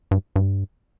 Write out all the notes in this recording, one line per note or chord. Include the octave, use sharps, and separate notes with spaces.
G2
G2